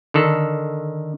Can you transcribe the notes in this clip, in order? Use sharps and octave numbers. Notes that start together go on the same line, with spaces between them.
D3 D#3 A4